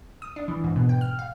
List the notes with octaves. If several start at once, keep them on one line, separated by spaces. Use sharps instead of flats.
D#6
D4
E3
G#2
B2
G5
F6
F5